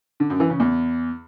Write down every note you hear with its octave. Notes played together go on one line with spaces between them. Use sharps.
D3
F#2
E3
C#3
E2